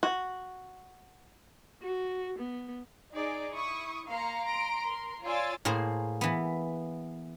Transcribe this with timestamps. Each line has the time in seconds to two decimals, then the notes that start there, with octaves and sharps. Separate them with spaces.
0.03 F#4
1.82 F#4
2.38 B3
3.12 D#4 G#4 D5
3.54 E4 C#6 D#6
4.08 A#3 F5 A#5 C6 C#7
4.43 A#5 C6 D7
4.84 A#4 C6
5.23 F4 C#5 D5 G#5 E6 A6
5.65 A2 A#3 G#4 C5
6.21 E3 B3